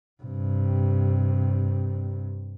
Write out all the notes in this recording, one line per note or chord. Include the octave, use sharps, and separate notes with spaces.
G2 C3